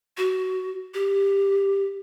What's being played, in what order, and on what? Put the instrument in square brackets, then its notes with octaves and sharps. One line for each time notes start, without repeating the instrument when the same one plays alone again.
[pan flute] F#4
G4